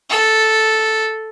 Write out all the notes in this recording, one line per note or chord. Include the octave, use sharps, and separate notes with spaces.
A4